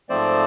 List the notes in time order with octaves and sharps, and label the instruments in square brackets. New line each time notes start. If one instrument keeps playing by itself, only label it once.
[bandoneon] G#2 F3 A3 C4 C5 D5